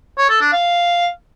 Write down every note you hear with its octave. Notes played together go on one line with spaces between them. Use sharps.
C#5
A4
D4
F5